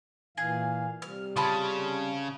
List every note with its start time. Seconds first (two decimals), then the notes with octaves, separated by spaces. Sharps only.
0.38 A#2 E3 G#4 F5
1.02 C3 G3 F6
1.36 C#3 F4 A5 B5